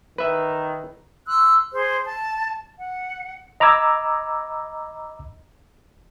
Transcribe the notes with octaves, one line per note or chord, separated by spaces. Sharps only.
D#3 B4 E5
C6 E6 F#6
G#4 C5
A5
F#5
D#5 A#5 B5 D6 E6 G#6